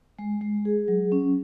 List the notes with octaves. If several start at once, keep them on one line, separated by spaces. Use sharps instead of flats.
G#3
G#3
G#4
F#3
C#4